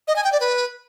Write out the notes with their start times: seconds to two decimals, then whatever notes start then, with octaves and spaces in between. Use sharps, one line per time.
0.08 D#5
0.16 G#5
0.24 G5
0.32 D5
0.40 B4